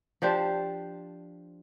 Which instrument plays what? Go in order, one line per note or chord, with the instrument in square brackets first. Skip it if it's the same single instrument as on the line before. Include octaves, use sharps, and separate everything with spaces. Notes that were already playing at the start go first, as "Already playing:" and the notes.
[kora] F3 D4 G4 C5